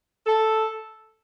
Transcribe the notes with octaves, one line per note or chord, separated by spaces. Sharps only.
A4